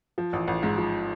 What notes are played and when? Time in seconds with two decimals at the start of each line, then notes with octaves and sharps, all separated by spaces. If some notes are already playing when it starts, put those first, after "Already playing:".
0.18 F3
0.33 A1
0.48 A1
0.63 G#2
0.78 F3